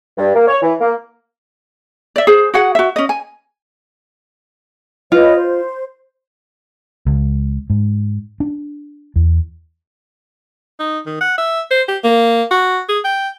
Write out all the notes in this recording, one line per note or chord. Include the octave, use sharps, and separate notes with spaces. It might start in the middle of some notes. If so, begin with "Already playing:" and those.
G2
A#3
C#5
E3
A#3
D5 E5
G#4 C5
F#4 G#4 F#5
F#4 E5
C#4 D#5
G#5
F4 B4 C#5 D#5
C5
C#2
G#2
D4
E2
D#4
D#3
F#5
E5
C5
G4
A#3
F#4
G#4
G5